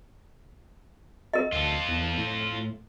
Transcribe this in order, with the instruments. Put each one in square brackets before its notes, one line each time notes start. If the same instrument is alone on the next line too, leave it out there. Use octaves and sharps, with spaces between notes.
[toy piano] A#4 D#5
[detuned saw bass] D2 [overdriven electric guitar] F4 A4
[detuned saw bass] E2
A2